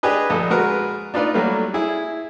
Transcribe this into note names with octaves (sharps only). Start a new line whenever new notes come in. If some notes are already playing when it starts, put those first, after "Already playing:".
D4 G4 G#4 B4 D#5
A#1 A4 D#5
G#3 F#4 A#4 B4
D4 D#4 F4 B4 D5
F#3 G3 A3 A#3 F#4
E4 G#4